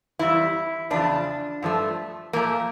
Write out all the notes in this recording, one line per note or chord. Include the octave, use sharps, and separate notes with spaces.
F2 E3 G3 E4
E2 C#3 F3 D4
G2 F3 A3
A#2 F3 A3 A#3